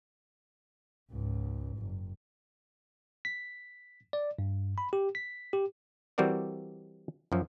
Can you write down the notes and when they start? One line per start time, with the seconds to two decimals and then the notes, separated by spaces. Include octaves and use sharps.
1.12 C#2 G#2
1.78 F#1
3.25 B6
4.13 D5
4.39 G2
4.78 B5
4.93 G4
5.15 B6
5.53 G4
6.18 E3 G3 C4 F#4 A#4 D5
7.32 F#2 F3 F#3